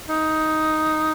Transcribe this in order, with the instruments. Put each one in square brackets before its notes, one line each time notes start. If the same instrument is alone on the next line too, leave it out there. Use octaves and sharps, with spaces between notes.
[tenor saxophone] D#4